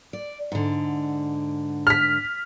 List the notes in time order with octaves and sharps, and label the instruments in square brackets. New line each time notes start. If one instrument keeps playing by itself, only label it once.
[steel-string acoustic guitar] D5
G#2 D3
[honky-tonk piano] F6 B6